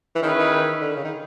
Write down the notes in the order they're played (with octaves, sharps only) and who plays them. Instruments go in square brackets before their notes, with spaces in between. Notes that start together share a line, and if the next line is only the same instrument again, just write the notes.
[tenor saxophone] E3
[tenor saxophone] D#3 [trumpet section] C#4 E4 G#4 B4
[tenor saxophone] D#3
D3
C#3
D#3